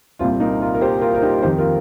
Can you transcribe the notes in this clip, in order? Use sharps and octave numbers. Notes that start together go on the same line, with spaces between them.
C2 A#2 C4 F4
A#3 D#4
F4 A#4
A#4
G4 C5
F4 A#4
A#4
D#4 G4
F2 D#3 G4 C5
F4 A#4